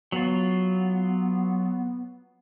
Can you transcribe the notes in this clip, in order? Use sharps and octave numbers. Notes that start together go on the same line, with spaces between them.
F#3 B3 F4